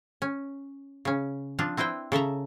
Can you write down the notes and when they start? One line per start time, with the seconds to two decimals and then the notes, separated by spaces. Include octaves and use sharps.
0.22 C#4
1.05 C#3 C#4
1.59 F3 C4 D4 F4
1.77 C4 E4 B4 C5 G5
2.12 C#3 A4 E5 A#5